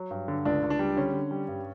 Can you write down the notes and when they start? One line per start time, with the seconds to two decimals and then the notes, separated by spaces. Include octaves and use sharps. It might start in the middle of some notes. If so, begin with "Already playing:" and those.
Already playing: F#3
0.11 G2
0.28 D3
0.45 C#2 D4
0.62 C#2
0.70 D4
0.79 G3
0.97 D3 C#4
1.14 D3
1.31 G3
1.48 G2